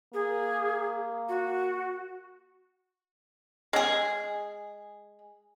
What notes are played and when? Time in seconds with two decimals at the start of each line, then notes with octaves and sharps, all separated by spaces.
0.14 A#3 G#4
1.29 F#4
3.73 G#3 G#4